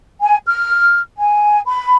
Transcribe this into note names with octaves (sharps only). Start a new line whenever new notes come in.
G#5
F6
G#5
B5